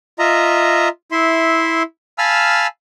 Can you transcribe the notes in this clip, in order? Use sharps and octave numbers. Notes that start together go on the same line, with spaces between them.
F4 D#5 E5 A#5
E4 E5 C6
F5 G#5 A5 B5 E6 F6